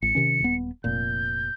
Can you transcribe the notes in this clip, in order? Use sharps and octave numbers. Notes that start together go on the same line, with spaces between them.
A1 C#7
C3 D#3 C#4
D#1 B3
F1 A#2 G6